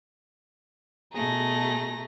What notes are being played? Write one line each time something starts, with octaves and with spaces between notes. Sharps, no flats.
B2 A3 G#4 A#5 A#6